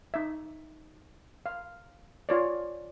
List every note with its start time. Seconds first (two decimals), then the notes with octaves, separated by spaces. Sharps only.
0.14 D#4 E5
1.46 F5
2.29 F4 C#5 D5